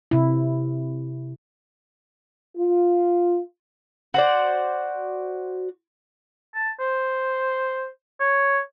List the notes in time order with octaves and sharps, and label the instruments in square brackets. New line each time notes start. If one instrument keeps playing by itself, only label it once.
[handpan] C3 E4
[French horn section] F4
[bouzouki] F#4 C5 D5
[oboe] A5
C5
C#5